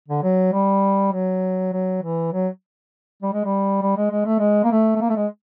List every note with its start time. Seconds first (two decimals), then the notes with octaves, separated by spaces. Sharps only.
0.08 D3
0.23 F#3
0.53 G3
1.12 F#3
1.73 F#3
2.03 E3
2.32 F#3
3.22 G3
3.33 G#3
3.44 G3
3.82 G3
3.97 G#3
4.11 G#3
4.26 A3
4.39 G#3
4.64 A#3
4.71 A3
4.96 A3
5.01 A#3
5.09 A3
5.16 G#3